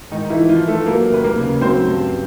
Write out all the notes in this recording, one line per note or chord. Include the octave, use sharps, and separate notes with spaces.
G#2 D#3 D#4
D#4
E3 E4
F3
F3 F4
F3
A3 A4
F#3 A#3 A#4
D#2 B4
A#3 A#4
C#3
F#3 C4 C5
G2